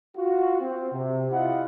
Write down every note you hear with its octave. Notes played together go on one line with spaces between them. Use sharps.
F4 F#4
C4
C3
E4 F4 D#5 F#5